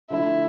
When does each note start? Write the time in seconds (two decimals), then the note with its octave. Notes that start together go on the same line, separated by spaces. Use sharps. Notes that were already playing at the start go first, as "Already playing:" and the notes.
0.10 D3 F3 A3 E4